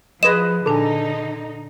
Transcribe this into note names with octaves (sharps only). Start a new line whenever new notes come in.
F3 G#4 B4 D#5 C6 E7
A#2 D3 D4 D#4 A4 G#5